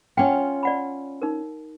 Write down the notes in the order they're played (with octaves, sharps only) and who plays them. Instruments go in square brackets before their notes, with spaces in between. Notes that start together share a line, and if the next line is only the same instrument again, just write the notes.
[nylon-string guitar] C#4 F4 [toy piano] F#5 G5
[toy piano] D5 F#5 B5
D#4 A#4